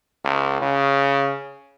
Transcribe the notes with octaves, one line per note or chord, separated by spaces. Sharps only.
C#2
C#3